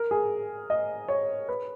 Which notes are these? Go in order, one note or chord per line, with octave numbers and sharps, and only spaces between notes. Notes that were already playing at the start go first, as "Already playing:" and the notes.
Already playing: A#4
G#4
D#5
C#5
B4